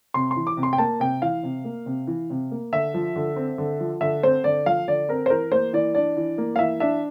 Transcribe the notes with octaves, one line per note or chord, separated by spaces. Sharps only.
C3 C6
C6
E3
D6
C3
C6
G5
A#3 A5
C3 G5
E3 F5
C3
A#3
C3
E3
C3
A#3
D3 E5
F3
D3
C4
D3
F3
D3 E5
C4 C5
D3 D5
F3 F5
D3 D5
C4 A#4
C5
E3 A#4
A#3 C5
E3 D5
D4 D5
E3
A#3
F5
E3 E5
D4 E5